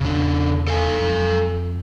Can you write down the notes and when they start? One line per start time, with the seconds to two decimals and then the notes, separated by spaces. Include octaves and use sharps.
0.01 E2 C#3 D4
0.68 A4 F5 G#5
1.00 F2